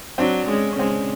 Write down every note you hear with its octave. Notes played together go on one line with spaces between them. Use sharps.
F#3 C4 D4
G#3 C#4
C#4
G#3 C4